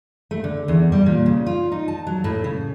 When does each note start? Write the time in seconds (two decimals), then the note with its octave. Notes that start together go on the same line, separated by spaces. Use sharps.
0.31 A3
0.44 D3
0.68 E2
0.92 G3
1.06 A#2
1.26 C#3
1.46 F4
1.72 D#4
1.88 A5
2.07 F#3
2.24 A2
2.44 C#3